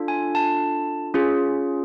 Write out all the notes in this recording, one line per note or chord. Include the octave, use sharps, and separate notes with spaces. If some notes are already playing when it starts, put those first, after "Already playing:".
Already playing: D4 F4 A4
G#5
A5
C#4 F4 G#4